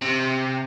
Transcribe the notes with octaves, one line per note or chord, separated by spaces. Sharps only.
C3